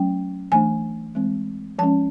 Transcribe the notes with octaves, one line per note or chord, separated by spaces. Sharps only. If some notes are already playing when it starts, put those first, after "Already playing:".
Already playing: F#3 A3 C#4 G5
E3 A3 D4 G#5
E3 G#3 C4
F3 G#3 C#4 A5